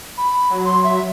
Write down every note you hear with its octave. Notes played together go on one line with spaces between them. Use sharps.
B5
F#3
C6
E5